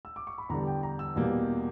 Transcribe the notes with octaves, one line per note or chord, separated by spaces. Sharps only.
E6
D6
C#6
B5
E2 D3 G3 A#5
G5
A#5
E6
E2 B2 G3 A#3